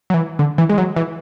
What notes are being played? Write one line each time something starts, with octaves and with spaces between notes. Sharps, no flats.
F#3
E3
D3
E3
G#3
F#3
E3